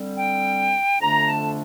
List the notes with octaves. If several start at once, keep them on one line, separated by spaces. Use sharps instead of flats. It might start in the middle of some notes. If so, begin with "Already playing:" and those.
Already playing: D3 G3 C4
G5
F2 D3 A3 D4 A#5
A5